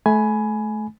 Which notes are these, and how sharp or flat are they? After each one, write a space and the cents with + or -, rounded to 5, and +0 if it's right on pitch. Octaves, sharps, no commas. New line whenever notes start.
A3 -30 G#5 +15 B5 +0